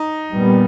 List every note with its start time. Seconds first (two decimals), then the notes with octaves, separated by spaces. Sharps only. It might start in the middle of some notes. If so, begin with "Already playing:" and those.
Already playing: D#4
0.34 A#2 G3 B3